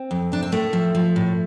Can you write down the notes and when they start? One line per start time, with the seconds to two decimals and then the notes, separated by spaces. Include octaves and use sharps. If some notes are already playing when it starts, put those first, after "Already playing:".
Already playing: C4
0.11 F2
0.32 C3 D4
0.43 C4
0.52 A2 A3
0.73 F3
0.95 F3
1.16 A2